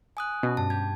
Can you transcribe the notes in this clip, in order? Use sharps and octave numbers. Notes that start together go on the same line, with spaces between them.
G#5 D#6 F#6
B2 C#4
G2 A5
G4 G#6